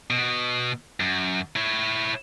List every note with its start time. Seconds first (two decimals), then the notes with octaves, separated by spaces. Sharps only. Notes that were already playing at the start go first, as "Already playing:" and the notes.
0.10 B2
1.00 F#2
1.56 E4 C#5